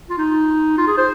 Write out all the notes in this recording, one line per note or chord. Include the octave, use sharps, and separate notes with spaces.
F4
D#4
F4
G#4
C5